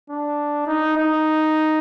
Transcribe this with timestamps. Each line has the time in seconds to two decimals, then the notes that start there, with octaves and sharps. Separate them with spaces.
0.10 D4
0.67 D#4
0.97 D#4